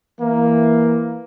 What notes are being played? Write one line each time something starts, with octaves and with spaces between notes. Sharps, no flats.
E3 A#3